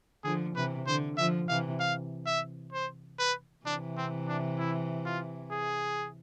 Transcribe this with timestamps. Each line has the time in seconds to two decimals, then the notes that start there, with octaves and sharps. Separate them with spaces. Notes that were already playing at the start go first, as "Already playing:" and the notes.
0.24 D3 F3 G#4
0.56 C3 E3 B4
0.86 D3 C5
1.17 D3 F3 E5
1.49 C3 E3 F5
1.80 F5
2.26 E5
2.73 C5
3.19 B4
3.66 C3 E3 D4
3.97 C4
4.28 D4
4.59 E4
5.05 F4
5.52 G#4